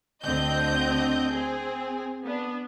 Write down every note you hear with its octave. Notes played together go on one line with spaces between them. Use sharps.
D2 D3 C4 D#5 G6
C4 G#4
B3 D4